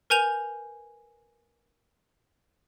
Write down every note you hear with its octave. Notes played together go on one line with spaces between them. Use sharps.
A#4 B4 G#5 G6 F7